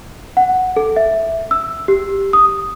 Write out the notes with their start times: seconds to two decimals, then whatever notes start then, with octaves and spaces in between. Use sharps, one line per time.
0.37 F#5
0.76 A4
0.96 E5
1.51 E6
1.88 G4
2.33 D#6